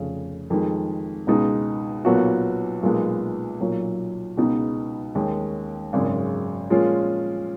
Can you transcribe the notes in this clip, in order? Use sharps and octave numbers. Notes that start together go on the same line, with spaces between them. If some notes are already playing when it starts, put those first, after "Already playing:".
Already playing: F1 F2 C#3
F2 D#3 G#3
C#2 B2 G#3 D#4
B1 A#2 F#3 B3 F#4
B1 A#2 G#3 B3
B1 A#2 F#3
C#2 B2 G#3 B3 D#4
D#2 D#3 G#3 C#4
G#1 F#2 C#3 G#3
A#2 F3 G#3 C#4 F4